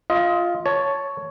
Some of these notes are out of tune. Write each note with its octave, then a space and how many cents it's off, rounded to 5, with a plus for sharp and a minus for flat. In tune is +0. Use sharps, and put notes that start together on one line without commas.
F4 +0 D#5 +30
C#5 +5 A5 +0